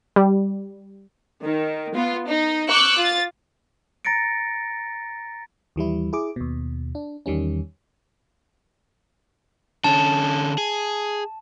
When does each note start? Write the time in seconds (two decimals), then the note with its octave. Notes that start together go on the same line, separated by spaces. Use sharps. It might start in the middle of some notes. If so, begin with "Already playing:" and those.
0.16 G3
1.43 D#3
1.95 B3 F4
2.27 D#4
2.68 C#6 D6 E6 F#6 G6
2.97 F4 A6
4.05 A#5 A6 A#6 C#7 D7
5.76 D#2 E3 G3 E4
6.13 E4 G#4 D6
6.36 D#2 B2
6.95 D4
7.26 E2 D#3 G3 C#4
9.84 D3 C#4 A5
10.58 G#4